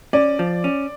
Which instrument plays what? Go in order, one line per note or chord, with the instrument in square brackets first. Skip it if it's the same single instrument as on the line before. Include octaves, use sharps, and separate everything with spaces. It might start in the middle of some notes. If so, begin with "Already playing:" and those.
[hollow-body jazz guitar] C#4 [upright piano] D5
[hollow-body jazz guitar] F3
C#4